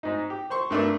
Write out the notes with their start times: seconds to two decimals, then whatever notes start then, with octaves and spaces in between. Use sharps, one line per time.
0.03 G#2 D#4
0.30 G4
0.50 C5 C6 C#6
0.71 G2 A3 A#3 D4